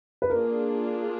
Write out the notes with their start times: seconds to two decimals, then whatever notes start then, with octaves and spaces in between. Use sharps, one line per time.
0.22 B4
0.30 A#3 D4 F4 G#4 A#4